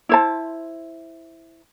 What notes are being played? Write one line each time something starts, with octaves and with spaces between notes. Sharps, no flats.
E4 C5 A5